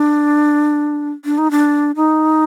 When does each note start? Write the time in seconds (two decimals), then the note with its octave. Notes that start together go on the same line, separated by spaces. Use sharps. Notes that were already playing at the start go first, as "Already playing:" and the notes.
Already playing: D4
1.25 D4
1.38 D#4
1.51 D4
1.96 D#4